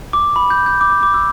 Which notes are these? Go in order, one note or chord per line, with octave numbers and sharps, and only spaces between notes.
D6
B5
G6
G6
D6
D6
D6
E6